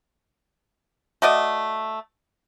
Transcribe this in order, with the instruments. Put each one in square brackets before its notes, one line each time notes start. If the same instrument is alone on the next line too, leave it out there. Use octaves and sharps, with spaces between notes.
[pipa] A3 F#4 D5 D#5